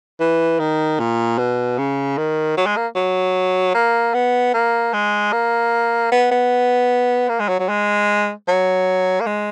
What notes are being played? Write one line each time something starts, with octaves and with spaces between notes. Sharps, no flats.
E3
D#3
A#2
B2
C#3
D#3
F#3
G#3
A#3
F#3
A#3
B3
A#3
G#3
A#3
B3
B3
A#3
G#3
F#3
F#3
G#3
F#3
A#3
G#3